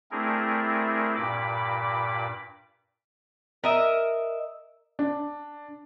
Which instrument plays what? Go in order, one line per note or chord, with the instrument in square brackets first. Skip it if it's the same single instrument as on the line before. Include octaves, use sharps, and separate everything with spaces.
[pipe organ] A3 C4 D4 E4 G#4 A#4
G2 A#2 B5 D6
[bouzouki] A#4 D#5 E5
[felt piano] D4